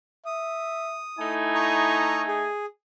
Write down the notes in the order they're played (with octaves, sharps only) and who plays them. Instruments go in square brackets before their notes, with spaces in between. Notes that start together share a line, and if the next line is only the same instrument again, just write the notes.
[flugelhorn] E5 [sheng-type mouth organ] D#6
[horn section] A3 D#4 G#5 [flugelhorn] E4
[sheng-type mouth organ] A#5 C#6 D#6
G#4